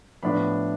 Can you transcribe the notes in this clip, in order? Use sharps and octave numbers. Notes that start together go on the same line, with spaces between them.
A2 F3 B3 D4 B5